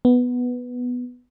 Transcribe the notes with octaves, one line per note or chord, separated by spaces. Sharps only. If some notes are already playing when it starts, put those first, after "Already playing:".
B3